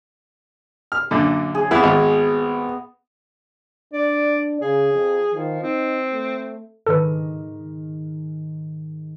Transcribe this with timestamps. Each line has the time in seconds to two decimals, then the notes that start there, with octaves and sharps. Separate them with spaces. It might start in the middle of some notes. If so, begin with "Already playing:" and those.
0.92 F6
1.11 F#2 A#2 D3
1.55 G#4
1.71 F2 B3 E4
1.83 G#1
3.93 D4 D5
4.61 C#3 G#4
4.93 F2
5.34 D#3 F3
5.62 C4 D#4
6.13 A3
6.86 G#2 D#3 A4 B4